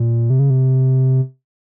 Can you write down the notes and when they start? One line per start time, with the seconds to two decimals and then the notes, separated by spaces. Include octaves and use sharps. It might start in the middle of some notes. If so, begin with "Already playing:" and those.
Already playing: A#2
0.30 C3
0.39 C#3
0.50 C3